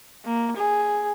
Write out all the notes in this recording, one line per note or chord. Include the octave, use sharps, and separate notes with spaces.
A#3
G#4